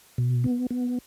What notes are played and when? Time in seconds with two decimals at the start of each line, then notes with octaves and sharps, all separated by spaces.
0.18 B2
0.44 B3
0.71 B3